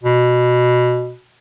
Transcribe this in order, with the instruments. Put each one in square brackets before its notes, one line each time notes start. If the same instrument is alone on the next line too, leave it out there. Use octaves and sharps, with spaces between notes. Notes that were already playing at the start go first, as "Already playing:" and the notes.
[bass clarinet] B2